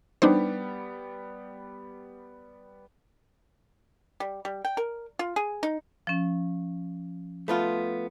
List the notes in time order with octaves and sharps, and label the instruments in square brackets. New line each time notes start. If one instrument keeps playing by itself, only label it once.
[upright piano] G3 B3 G4 [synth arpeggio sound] D4 D#4 C5
[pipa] G3
G3
G5
A#4
F4
G#4
D#4
[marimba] F3 C#4
[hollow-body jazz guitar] A3 B3 F4 [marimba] B5